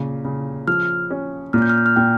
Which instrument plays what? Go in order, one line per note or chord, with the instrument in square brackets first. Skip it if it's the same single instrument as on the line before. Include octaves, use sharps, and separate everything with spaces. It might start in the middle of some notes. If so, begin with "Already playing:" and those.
Already playing: [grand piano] A#2 C#3
C#3
[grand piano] F3 [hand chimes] F6
[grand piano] C#4
[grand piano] A#2 [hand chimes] F6
[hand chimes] G6
F6
G6
F6
[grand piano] A#2 [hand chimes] G5